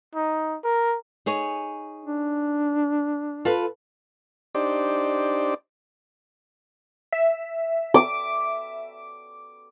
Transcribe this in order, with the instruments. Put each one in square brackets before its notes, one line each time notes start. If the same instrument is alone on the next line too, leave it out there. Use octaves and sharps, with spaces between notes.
[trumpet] D#4
A#4
[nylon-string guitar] D#4 G#4 C#5
[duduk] D4
[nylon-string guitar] F4 A4 B4
[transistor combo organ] D4 D#4 G4 C5 D5
[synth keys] E5
[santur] D6